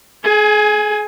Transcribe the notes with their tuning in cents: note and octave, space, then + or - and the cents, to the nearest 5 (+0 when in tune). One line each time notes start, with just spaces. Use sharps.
G#4 +35 G#5 +5